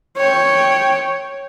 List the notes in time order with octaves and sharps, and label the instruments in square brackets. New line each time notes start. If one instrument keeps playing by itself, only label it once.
[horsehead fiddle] C#5 G5